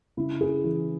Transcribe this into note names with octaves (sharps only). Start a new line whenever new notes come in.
C#3 E4
G#4
E3